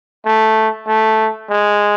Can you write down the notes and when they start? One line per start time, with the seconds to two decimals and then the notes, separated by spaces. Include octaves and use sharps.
0.25 A3
0.87 A3
1.50 G#3